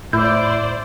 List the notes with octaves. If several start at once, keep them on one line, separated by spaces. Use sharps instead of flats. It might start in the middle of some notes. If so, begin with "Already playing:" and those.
A2 E4 C5 D5 G6